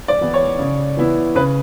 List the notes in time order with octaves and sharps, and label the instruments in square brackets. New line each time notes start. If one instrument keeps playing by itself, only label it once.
[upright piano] D5
[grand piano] E3 B3 E4
[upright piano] C#5
[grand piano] C#3
E3 B3 E4
[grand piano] C#3 [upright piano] B4